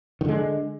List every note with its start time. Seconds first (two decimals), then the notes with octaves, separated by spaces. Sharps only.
0.21 D#3
0.25 D3
0.29 G#3